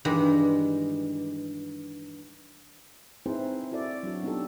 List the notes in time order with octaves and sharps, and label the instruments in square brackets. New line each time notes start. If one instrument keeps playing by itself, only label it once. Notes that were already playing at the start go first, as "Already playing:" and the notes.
[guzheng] G2 D#3 E3 G3 G#3
[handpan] C4 D#4 E4 G#4 B4 C5
E4 F#4 A4 D5
F#3 D4 F#4
B3 D4 D#4 F4 G4 A4